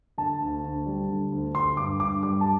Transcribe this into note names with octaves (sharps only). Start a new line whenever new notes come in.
D3 A5
D2
D2
G3
D3
D2
D3 C6
G2 D6
G2 D6
G3 D6
A5